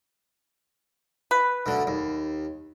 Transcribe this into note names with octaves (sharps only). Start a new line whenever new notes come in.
B4
D2 D3
D#2